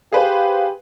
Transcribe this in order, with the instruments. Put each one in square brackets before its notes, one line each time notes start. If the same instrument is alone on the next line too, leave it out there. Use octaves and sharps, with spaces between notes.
[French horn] G4 [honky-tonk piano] G#4 B4 C5 [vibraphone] F5